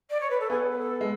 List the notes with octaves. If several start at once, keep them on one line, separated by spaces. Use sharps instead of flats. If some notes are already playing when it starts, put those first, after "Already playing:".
D5
C#5
B4
A4
B3 G#4
B4
A4
G#3